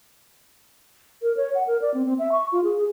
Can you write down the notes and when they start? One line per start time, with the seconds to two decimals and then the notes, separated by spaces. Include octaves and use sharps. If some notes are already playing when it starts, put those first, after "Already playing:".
1.22 A#4
1.37 C#5
1.55 F#5
1.67 A#4
1.82 D5
1.94 C4
2.06 C4
2.19 E5
2.32 C#6
2.52 F4
2.64 G#4
2.78 G#4